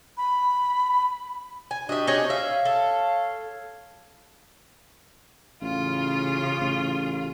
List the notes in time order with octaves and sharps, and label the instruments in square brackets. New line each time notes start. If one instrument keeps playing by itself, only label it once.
[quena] B5
[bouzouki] G#5
[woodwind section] D4 F#4 G4 [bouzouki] D#5 E5
[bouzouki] D#4 G#4 C#5
[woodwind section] C#5 F5 [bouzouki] E5
[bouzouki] A4
[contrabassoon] A1 [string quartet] C#3 F4
[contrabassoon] A1